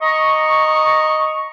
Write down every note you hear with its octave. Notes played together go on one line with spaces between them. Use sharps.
D#5 A#5 C#6